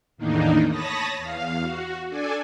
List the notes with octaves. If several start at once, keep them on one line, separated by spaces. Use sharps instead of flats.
E2 A2 D#3 A#3 D4 D#4
C#5 A5 B5 D#6 A#6
E2 F5
F#4
D4 A4 D5 G#5